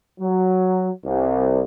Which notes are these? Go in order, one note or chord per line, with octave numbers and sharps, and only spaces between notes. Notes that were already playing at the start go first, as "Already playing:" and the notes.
F#3
C2